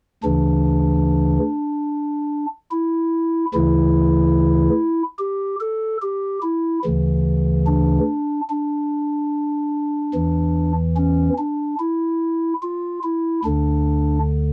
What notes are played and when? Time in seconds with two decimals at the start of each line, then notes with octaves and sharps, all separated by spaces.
0.23 D2 C#3 E3 D4
2.71 E4
3.54 D2 C#3 E3 E4
5.19 G4
5.60 A4
6.02 G4
6.42 E4
6.84 D2 C#3 E3
7.67 D4
8.50 D4
10.14 E2 E3
10.96 C#4
11.38 D4
11.79 E4
12.63 F4
13.03 E4
13.45 D2 D3 D4